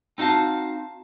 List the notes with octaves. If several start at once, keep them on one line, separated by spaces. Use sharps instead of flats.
C4 D#4 F#4 F5 A5